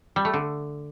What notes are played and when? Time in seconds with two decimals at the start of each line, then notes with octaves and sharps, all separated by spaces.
0.16 G3
0.25 A3
0.34 D3